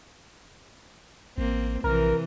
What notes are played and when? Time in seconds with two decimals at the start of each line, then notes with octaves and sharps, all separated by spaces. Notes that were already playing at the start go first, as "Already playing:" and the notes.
1.38 A1 A#3 C4
1.84 A#1 C3 E3 A#4